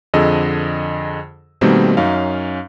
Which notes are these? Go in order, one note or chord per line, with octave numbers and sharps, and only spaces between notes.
F2 D3 G#4 D#5 E6
B2 D#3 G3 A3 A#3 C4
F#2 C#4 D#4 F5